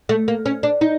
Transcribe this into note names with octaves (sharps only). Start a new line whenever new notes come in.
A3
A#3
C#4
D4
D#4